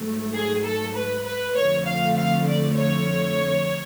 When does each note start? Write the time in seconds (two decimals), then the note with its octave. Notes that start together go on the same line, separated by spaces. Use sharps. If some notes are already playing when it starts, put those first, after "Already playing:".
Already playing: G#2 F#3 A3
0.33 G#4
0.63 A4
0.95 B4
1.24 B4
1.55 F2 D3 F3 A3 C#5
1.85 F5
2.16 F5
2.46 D5
2.77 C#5